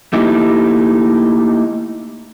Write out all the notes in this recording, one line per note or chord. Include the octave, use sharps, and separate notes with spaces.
A3 A#3 D#4 E4 G4